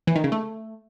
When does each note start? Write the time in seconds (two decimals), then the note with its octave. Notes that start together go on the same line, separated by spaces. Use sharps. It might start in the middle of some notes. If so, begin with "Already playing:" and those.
0.07 E3
0.15 D#3
0.24 C#3
0.32 A3